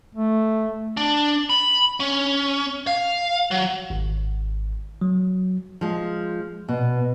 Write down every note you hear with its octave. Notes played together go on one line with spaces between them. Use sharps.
A3
D4
B5
C#4
F5
F#3
G#1
F#3
F3 G#3
B2